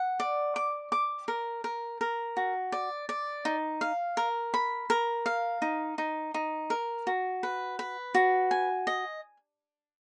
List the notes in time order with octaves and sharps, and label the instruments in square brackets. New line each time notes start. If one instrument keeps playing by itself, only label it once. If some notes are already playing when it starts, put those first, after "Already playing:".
Already playing: [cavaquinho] F#5
D5
D6
D6
A#4
A#4
A#4
F#4
D5
D5
D#4
F5
A#4
B5
A#4
F5
D#4
D#4
D#4
A#4
F#4
B4
B4
F#4
G#5
D#5